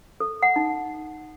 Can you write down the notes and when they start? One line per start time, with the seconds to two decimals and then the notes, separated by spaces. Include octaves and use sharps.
0.20 A4
0.43 F#5
0.56 D#4